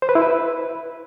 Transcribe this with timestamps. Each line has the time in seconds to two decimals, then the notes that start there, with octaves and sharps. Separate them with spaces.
0.02 C5
0.09 B4
0.15 E4
0.22 B4